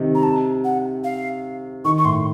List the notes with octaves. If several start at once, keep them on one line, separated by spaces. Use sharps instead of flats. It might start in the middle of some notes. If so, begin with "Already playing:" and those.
Already playing: C3 D#3
A#5
A5
F#5
F5
D#3 C#6
C#6
A2 C6